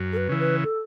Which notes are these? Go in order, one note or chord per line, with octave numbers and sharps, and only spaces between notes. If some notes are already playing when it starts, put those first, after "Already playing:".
Already playing: F#2
A4
B4
C#3 E3
B4
A4